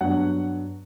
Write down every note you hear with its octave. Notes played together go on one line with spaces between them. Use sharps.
G2 F#3 B3 D4 F#5